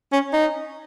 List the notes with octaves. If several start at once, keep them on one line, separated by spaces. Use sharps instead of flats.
C#4
D#4